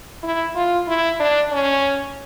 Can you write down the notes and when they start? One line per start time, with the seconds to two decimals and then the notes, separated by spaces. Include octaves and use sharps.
0.23 E4
0.55 F4
0.88 E4
1.20 D4
1.52 C#4